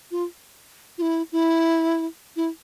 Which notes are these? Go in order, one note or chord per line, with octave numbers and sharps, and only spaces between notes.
F4
F4
E4
E4
E4